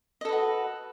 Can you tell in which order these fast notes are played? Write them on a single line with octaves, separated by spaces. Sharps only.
D#5 A4 B4 F#4